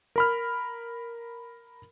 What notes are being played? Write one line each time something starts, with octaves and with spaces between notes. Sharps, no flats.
A#4 B5 F6